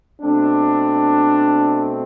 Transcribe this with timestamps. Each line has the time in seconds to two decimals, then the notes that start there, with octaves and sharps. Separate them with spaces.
0.22 B2 A3 C4 D4